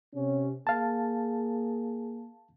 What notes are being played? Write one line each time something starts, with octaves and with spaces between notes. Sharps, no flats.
C3 C#4
A#3 G#4 F5 A5